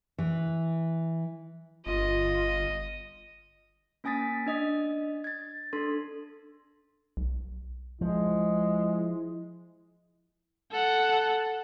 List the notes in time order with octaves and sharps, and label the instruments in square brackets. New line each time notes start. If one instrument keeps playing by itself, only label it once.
[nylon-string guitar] E3
[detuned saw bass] G1 [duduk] F4 [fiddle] D#5
[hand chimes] A#3 C#4 G#5 D#6 A6 B6
D4 D#5 D#6
G#6 A6
D4 A4 C6
[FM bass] B1
[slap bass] F3 [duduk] G#3 [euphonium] E4
[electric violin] A4 F#5